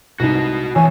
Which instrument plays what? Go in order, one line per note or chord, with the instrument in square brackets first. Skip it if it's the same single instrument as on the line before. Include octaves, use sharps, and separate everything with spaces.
[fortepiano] C2 G#2 [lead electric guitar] F#4 D#5
[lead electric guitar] F2 B2 [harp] E3 C#5 E6 [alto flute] G#5